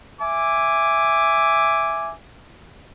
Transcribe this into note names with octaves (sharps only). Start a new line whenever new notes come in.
E5 G#5 D6